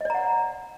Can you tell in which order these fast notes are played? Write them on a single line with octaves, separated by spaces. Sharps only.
D#5 D5 A#5 F#5